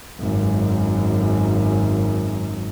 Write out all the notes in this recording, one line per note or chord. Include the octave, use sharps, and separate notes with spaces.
G#1 F#2